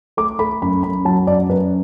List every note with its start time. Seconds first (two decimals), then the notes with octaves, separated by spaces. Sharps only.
0.17 A3 D6
0.39 A3 B5
0.62 F#2 B5
0.83 F#2 B5
1.05 F#3 A5
1.27 F#2 D5
1.49 F#2 B4